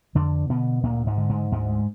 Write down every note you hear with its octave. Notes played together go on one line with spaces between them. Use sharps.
F2 D3 D4
B2 D3 B3
D2 A#2 A#3
G#2 G#3
D3
G#2 G#3
D2 G#2 G#3